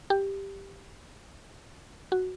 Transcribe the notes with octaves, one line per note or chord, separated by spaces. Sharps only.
G4
F#4